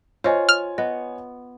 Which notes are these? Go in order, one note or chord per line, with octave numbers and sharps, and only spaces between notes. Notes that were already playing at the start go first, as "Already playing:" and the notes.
F4 C5 C#5 D#5 G#5
F6
B3 D#5